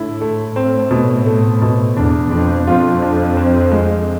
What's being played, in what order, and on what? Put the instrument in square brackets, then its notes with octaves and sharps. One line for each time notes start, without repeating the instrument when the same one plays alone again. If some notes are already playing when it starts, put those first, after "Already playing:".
Already playing: [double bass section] A2 [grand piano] D3 E4
[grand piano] A3
[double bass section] A2 [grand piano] C4
[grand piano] B2
A3
B2
[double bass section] E2 [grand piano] D4
[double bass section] F2 [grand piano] D4
[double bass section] F2 [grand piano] F4
[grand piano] D4
C4
G#3